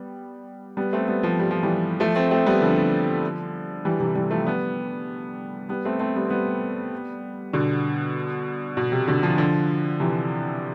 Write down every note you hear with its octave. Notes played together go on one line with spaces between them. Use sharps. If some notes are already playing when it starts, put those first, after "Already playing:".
Already playing: G3 B3
G3 B3
A3 C4
G3 B3
F3 A3
G3
F3
E3 G3
F3 A3
A3 C4
A3 C4
G3 B3
D3 F3
E3 G3
C3 E3
E3 G3
F3 A3
G3 B3
G3 B3
A3 C4
A3 C4
G3 B3
C4
G3 B3
B2 D3
B2
C3
B2 D3
D3 F3
D3 F3
C3 E3